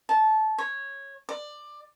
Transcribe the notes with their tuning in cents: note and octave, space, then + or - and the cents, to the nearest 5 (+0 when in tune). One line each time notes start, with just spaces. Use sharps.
A5 -20
C#5 -10
D5 +15